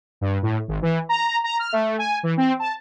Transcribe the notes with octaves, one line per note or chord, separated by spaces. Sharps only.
G2
A2
G#1
E3
A#5
A#5
F6
A3
G#5
E3
C4
A5